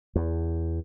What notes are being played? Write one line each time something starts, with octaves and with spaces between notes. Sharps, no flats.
E2